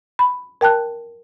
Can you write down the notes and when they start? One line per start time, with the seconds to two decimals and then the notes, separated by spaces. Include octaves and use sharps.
0.19 B5
0.61 A#4 G5 A5 F#6